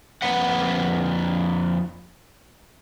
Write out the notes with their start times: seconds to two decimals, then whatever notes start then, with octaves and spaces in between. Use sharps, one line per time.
0.22 F2 A#3 B4 F#5